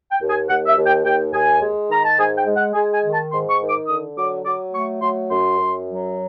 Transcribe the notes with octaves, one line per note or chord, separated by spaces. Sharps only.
G5
D#2
G#5
D#2 F#5
E5
D#2
G5
D#2 G5
D#2 G#5
G#3
D#3 A#5
A5
G#2 G#5
G5
G#3
F#5
G#3 G#5
G#5
D#3
A5
G#2 C6
C#6
D#3
D6
D3 D#6
F#3 D6
F#3 D6
A3 C#6
F#3 C6
F#2 C6
F#2
F#3